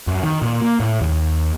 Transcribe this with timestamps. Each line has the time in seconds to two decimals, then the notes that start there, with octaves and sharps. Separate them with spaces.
0.07 F#2
0.23 D#3
0.42 A#2
0.62 A#3
0.80 A2
1.01 D#2